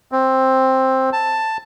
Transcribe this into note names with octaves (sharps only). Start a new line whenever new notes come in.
C4
A5